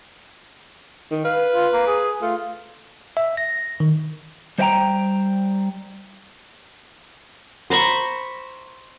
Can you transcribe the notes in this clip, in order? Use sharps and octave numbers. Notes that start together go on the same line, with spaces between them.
D#3
B4 F5
F4
A#3
G#4
A3 F4
E5
A#6
D#3
G3 C5 D#5 F5 G5 A#5
C5 A#5 B5 C#6